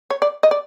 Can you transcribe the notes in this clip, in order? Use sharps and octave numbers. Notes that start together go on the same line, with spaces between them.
C#5
D5
D#5
D5